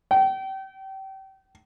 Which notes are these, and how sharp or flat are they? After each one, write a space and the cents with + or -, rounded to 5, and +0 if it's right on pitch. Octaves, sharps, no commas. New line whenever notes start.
G5 -30